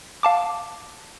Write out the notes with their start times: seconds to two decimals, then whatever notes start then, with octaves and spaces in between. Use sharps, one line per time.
0.23 F5 A5 D6